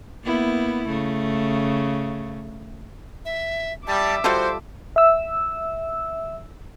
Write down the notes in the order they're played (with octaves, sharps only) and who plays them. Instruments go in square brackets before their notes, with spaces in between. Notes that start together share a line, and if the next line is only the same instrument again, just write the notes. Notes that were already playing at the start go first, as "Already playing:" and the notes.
[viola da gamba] A#3 B3 E4
C#3 A3
[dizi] E5
[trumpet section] G3 [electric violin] E5 D6 [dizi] A5
[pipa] G3 F4 A4 [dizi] F#4 [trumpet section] C5
[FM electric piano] E5 E6